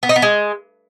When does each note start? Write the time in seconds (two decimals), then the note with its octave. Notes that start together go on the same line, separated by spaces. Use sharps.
0.03 B3
0.09 D#4
0.16 B3
0.22 G#3